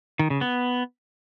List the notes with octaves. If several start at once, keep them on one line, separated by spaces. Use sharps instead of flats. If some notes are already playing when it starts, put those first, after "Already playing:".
D#3
C#3
B3